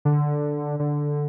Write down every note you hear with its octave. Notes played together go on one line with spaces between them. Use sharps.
D3
D3